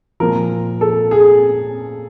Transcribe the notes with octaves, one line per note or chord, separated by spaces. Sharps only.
A#2 F3 A#4
A4
G#4